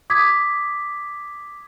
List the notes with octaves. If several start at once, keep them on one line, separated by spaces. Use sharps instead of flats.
D6 D#6 G#6 B6